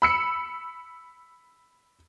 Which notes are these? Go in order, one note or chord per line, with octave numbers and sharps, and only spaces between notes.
B5 E6 C#7